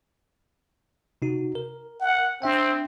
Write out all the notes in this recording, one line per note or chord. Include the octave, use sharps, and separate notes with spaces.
C3 D#4 F#4
A#4
F#5
C4 D4 E5 G5